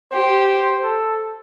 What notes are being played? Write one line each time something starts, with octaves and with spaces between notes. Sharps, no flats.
G4 C5
A4